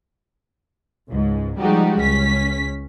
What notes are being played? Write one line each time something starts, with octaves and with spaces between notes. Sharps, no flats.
C#2 G#2
F3 G3 G#3 D#4 F#4 G4
C#2 C#4 B6